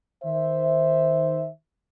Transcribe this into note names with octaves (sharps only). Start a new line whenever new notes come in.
D#3 C5 E5